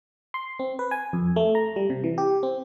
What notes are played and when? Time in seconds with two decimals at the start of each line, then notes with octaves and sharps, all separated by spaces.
0.34 C6
0.59 C4
0.79 B4
0.91 G#5
1.13 F2
1.36 A3
1.55 A#5
1.76 G3
1.90 C3
2.04 E3
2.18 G4
2.43 C4